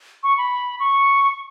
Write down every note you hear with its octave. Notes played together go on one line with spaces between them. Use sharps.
C#6
B5
C#6